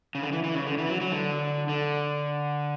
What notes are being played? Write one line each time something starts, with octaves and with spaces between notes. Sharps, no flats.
C#3
D3
E3
E3
C#3
D3
E3
F#3
F#3
D3
D3